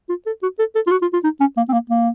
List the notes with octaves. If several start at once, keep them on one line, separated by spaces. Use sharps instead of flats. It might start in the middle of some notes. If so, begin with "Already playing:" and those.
F4
A4
F#4
A4
A4
F4
F#4
F4
F4
D#4
C#4
A#3
C4
A#3
A#3